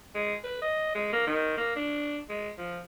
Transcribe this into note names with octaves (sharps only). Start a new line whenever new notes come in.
G#3
B4
D#5
G#3
A#3
D#3
A#3
D4
G#3
F3